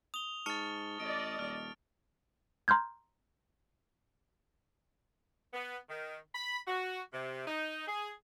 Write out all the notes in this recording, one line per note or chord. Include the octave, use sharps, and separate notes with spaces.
D#6 F7 G7
G#2 A5 C#6 F6 A6 C#7
A1 D5 D#5 D7
D#1 F6
A#5 C6 F6 G6 G#6
B3
D#3
B5
F#4
C3
D#4
G#4